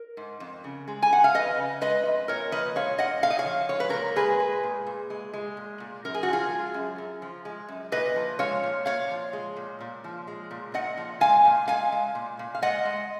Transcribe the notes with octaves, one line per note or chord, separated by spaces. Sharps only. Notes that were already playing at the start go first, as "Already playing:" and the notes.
Already playing: A#4
G#2
F2
C#3
G#3
G#5
F2 F#5
F5
F2 B4 D#5
C#3
G#3 B4 D#5
F2
A#2 A#4 C#5
F3 B4 D#5
G#3 C#5 F5
A#2 D#5 F#5
A#2 F5
D#5
C#5 F5
F3
G#3 C#5
B4
A#2 A#4 C#5
G#3 G#4 B4
G#3
A#2
A#2
G#3
G#3
A#2
A#2
F#2 A#4
G#4
F#4
F3 F4 G#4
G#3
F#2
F#2
F3
G#3
F#2
A#2 B4 D#5
F3
G#3 C#5 F5
A#2
A#2 C#5 F5
F3
G#3
A#2
A#2
F3
G#3
A#2
A#2 D#5 F#5
F3
G#3 F5 G#5
A#2
G#3 F5 G#5
G#3
A#2
A#2
F5
G#3 D#5 F#5
G#3